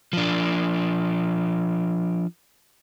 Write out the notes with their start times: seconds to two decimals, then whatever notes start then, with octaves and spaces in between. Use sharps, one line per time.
0.13 F3 D4